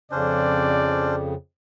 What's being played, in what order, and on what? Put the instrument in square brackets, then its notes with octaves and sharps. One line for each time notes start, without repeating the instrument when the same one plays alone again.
[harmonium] F2 C#3 [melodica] C#4 D4 C5 [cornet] D5